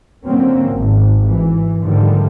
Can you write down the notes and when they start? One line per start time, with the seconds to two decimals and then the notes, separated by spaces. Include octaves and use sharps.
0.25 D3 F3 F#3 A#3 C4 C#4
0.71 G#1
1.26 E3
1.82 G#2 D3 D#3 F3 G3 A3